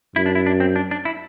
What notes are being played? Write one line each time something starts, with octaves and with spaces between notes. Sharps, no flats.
F#2 E4
D4
E4
D4
C4
D4
D4
E4